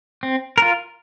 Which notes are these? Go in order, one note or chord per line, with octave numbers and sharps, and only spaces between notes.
C4
F4 A#4